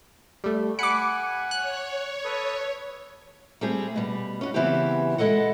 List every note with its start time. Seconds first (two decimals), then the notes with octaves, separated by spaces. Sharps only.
0.44 G3 A3
0.79 F#5 G#5 B5 D6 C#7
1.51 C#5 F#6
2.24 A4 B4 D#6
3.61 G3 A3 C4 G4 G#4
3.96 B2 G3
4.41 C#4 F4 F#4
4.54 C#3 E3 B3 C4 E4 G4
5.18 G#3 E4 A4 D#5 F#5